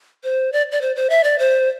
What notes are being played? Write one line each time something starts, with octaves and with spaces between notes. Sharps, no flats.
C5
D5
D5
C5
C5
E5
D5
C5